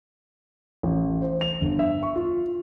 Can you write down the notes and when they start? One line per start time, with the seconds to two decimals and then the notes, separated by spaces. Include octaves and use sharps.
0.83 A1
1.22 C5
1.41 F7
1.61 G1
1.79 E5
2.03 C#6
2.16 F4